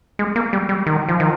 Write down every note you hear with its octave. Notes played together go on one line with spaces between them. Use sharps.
G#3
A#3
G3
G3
D#3
F3
D#3